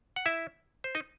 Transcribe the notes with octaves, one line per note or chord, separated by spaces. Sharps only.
F#5
E4 E5
C5
D#4 D#5